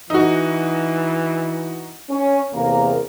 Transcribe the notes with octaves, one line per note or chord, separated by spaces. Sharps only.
E3 D#4 F#4
C#4
E2 C3 A#3 A#4